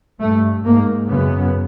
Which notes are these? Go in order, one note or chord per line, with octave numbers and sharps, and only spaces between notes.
G2 A3
G#2 A#3
F#2 C#3 B3